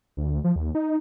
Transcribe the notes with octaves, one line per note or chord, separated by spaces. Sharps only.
D2
F3
D#2
D#4